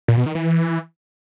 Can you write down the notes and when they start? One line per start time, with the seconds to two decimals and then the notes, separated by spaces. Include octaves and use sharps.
0.08 A#2
0.17 B2
0.26 D#3
0.35 E3